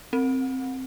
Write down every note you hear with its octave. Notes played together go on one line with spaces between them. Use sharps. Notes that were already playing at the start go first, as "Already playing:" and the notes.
C4